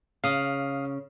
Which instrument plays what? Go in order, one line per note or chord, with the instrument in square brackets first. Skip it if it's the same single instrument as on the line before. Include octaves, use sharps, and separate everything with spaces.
[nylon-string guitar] C#3 [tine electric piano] F5 D#6